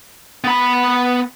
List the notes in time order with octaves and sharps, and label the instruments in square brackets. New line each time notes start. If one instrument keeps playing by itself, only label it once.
[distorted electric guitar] B3 B5